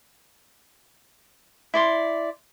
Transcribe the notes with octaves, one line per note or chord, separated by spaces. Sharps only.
E4 D5 C6